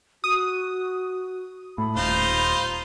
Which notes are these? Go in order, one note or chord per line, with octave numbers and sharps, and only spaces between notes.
F#4 D#6
A2 B5
D#1 D#4 F4 C5